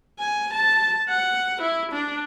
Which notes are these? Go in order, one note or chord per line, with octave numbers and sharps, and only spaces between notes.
G#5
A5
F#5
E4
D4